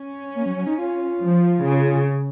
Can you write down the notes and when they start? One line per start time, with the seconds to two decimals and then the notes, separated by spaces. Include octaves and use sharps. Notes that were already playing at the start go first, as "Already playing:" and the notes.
Already playing: C#4
0.35 A#3
0.46 F#3
0.56 F#3
0.67 D#4
0.78 F4
1.21 F3
1.64 C#3